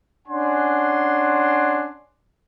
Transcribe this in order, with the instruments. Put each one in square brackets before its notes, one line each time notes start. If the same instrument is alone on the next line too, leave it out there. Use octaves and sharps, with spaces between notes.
[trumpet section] C#4 D4 F#5 G#5 C6